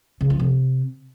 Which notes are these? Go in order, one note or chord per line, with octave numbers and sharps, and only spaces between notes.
C#3
F3
C3